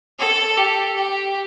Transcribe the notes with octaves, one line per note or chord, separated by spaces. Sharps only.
A4
G4
G4